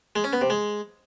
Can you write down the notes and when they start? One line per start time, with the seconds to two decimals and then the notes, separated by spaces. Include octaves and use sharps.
0.16 G#3
0.24 C#4
0.33 B3
0.41 C3
0.50 G#3